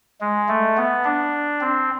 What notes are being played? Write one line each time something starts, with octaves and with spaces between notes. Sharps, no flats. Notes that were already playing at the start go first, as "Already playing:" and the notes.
G#3
A3
B3
D4
C4